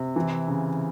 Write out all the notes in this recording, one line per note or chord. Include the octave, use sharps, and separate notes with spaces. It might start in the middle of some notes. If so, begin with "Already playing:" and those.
Already playing: C3
E3
C#3